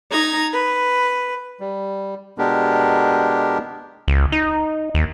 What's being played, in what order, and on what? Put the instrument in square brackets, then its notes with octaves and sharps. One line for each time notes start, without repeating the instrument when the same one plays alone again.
[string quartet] D#4 A#5 G#6
B4
[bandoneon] G3
B2 G#3 B3 D4 G4 A#4
[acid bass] C#2
D#4
D#2